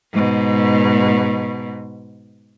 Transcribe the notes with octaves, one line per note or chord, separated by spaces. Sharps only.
G#2 B2